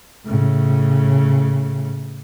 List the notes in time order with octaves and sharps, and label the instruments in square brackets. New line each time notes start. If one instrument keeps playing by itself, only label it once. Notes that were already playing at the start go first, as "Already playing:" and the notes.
[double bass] A2 C#3